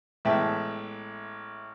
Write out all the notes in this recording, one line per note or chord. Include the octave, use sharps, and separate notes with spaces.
A1 G#3 B3 E5 G5 A5